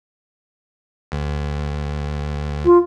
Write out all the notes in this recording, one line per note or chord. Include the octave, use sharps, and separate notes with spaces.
D2
F4